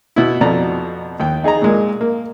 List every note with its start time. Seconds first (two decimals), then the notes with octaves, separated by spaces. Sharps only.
0.16 B2 E4
0.41 F2 B2 F3 D5 A#5
1.20 D#2 G5
1.44 D#4 G#4 D#5 A#5
1.62 A#2 G#3 A#3
2.01 A#3